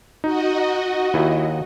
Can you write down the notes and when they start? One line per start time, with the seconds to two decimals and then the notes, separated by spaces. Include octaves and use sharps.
0.24 D#4 F#4 D#5
1.14 D#2 E4